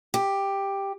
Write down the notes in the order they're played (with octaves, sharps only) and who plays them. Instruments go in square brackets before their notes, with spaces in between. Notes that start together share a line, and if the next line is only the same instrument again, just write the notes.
[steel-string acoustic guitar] G4